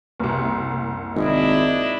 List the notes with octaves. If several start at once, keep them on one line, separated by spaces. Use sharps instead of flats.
F#1 C2
G#1 D4 E4 D#5